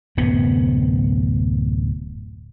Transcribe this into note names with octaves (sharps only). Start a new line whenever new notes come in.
D1 F#2 C3 B3